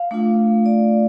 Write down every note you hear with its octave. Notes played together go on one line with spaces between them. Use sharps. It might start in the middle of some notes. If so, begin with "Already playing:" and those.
Already playing: F5
A3 D4 F4
D5